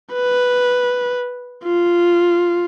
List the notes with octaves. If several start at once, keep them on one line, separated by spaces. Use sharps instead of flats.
B4
F4